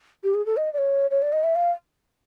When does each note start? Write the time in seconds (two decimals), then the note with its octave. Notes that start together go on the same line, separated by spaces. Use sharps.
0.24 G4
0.34 G#4
0.46 A4
0.57 D#5
0.73 D5
0.78 C#5
1.11 C#5
1.22 D5
1.32 D#5
1.43 E5
1.55 F5